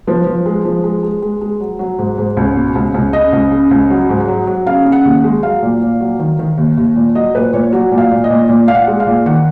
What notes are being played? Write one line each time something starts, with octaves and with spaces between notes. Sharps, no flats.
F3 B4
F3
G#3
F3
G#3
G#3
G#3
G#3
F#3
F#3
G#2
G#2
C#2
B2
C#2
C#2
C#3 D#5
C#2
C#3
C#2
F#3
G#2
F#3
F#3
C#3 F5
C#3
F#5
D#2
G#3
F#3 F5
A#2
A#2
F#3
D#3
D#3
D#2
D#2
A#2
F#3 D#5
A#2 B4
A#2 C#5
F#3 F#4
A#2
F5
A#2
D#5
A#2
A#2
A#2 F5
F#5
G#3
F5
A#2
D#3 F#5